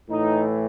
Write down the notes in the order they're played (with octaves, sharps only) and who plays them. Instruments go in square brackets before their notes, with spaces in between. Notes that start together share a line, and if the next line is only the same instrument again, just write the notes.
[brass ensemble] A2 E3 D#4